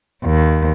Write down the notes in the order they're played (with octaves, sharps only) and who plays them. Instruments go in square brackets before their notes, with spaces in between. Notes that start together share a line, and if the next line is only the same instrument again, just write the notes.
[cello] D#2